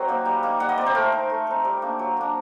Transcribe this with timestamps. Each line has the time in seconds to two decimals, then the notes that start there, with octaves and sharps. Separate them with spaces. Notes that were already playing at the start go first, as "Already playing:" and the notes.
Already playing: F#3 C4 C5 D#5 F#5
0.08 A#3 D#4
0.26 G3
0.43 A#3 D#4
0.60 G3 F#5
0.69 D#5
0.78 C4 D#4 D5
0.86 C5
0.95 A3 A#4
1.13 D#4
1.30 A3
1.47 C4 D#4
1.65 G3
1.82 A#3 D4
1.99 F#3
2.17 A#3 D4